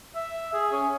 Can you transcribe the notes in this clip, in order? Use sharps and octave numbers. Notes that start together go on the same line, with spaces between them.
E5
G#4
C#4